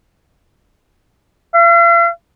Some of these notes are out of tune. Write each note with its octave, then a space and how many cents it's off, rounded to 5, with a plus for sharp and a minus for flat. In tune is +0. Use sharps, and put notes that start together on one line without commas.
F5 -45